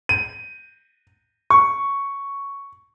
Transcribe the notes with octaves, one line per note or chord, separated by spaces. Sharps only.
D#7
C#6